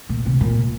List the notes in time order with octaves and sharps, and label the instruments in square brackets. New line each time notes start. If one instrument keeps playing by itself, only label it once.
[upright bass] A#2
C3
A#2